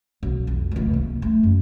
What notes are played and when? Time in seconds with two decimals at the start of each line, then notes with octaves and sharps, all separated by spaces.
0.23 B1
0.47 F2
0.71 F1 C#2
0.94 A#3
1.22 A3
1.43 F#2